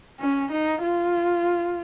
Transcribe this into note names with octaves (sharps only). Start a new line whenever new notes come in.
C#4
D#4
F4